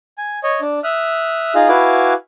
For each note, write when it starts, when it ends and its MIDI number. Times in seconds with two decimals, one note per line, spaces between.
0.18 0.39 80
0.43 0.60 73
0.43 0.60 75
0.61 0.79 62
0.84 1.54 76
0.84 1.54 87
0.84 1.54 89
0.84 1.54 90
1.55 1.68 63
1.55 1.68 65
1.55 1.68 68
1.55 1.68 75
1.55 1.68 77
1.69 2.14 64
1.69 2.14 66
1.69 2.14 71
1.69 2.14 77
1.69 2.14 80
1.69 2.14 86